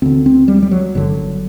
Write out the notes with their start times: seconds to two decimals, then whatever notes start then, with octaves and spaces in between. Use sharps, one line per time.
0.02 D2 D3 C4
0.26 C4
0.48 G3
0.63 G3
0.71 F#3
0.95 G1 G2 D3 F#3